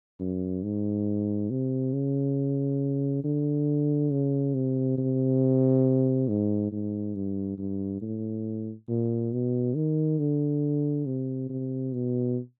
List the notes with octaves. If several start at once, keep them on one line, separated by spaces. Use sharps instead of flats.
F#2
G#2
C3
C#3
D3
C#3
C3
C3
G#2
G#2
G2
G2
A2
A#2
B2
D#3
D3
C3
C3
B2